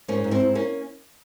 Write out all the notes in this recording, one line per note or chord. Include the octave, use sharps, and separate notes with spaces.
G#2 A#3 C#4
G#2
C4 E4
G#2
A#3 C#4